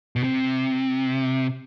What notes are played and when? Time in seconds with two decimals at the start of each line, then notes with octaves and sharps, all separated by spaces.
0.16 B2
0.23 C3